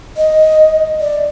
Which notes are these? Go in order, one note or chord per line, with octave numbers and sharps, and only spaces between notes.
D#5
D5